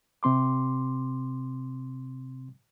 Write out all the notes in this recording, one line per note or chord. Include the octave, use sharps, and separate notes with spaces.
C3 C4 C6 D6